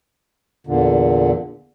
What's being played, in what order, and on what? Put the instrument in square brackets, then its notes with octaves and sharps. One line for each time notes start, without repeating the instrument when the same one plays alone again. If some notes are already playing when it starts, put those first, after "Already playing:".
[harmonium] E2 A#2 D3